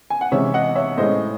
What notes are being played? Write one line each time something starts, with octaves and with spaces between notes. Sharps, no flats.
G#5
F#5
C3 E3 G#3 C#4 C#5 E5
D#5 F#5
C#5 E5
A2 G#3 C#4 C5 D#5